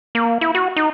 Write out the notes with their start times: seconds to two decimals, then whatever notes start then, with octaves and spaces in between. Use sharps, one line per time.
0.15 A#3
0.41 E4
0.55 F#4
0.76 D#4